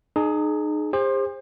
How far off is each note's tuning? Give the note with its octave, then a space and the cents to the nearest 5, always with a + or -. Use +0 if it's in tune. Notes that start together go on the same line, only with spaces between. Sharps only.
D#4 -30 G#4 +25
G4 +45 C5 +20